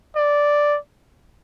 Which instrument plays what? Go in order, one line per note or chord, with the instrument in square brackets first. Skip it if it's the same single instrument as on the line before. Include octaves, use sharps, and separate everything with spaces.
[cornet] D5